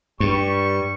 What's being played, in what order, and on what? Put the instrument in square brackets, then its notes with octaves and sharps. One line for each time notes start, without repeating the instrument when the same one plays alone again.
[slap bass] G2 [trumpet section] G3 C#6